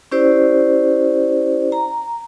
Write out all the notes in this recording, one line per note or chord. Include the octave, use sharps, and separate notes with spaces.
C#4 E4 G4 C5 D5
A#5